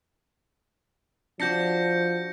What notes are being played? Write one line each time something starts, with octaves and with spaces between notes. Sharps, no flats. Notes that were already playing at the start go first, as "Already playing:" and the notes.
F3 D4 F#4 G6 A#6 C#7